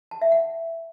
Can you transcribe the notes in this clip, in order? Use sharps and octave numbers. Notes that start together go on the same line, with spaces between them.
A5
E5
F#5